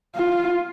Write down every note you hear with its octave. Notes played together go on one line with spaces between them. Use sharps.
F4